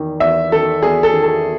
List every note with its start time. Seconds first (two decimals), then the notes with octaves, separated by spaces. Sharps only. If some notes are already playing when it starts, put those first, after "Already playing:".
Already playing: E2 D#3
0.20 E2 E5
0.52 D#3 A4
0.82 E2 G#4
1.03 A4
1.13 D#3
1.23 A4